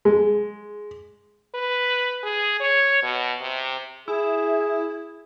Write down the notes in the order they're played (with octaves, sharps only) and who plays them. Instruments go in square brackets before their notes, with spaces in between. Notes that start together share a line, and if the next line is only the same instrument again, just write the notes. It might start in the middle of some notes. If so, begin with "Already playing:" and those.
[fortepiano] G#3
[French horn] B4
G#4
C#5
B2
C3
[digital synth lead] E4 [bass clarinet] G#4